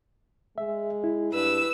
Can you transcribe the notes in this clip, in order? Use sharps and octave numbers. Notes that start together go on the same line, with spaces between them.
G#3 E5
E4
G2 B4 E6